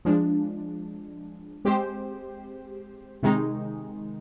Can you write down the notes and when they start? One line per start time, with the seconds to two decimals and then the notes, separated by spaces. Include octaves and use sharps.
0.05 F3 G#3 D4
1.65 G#3 C4 G4 C5
3.23 C3 D#3 G#3 D#4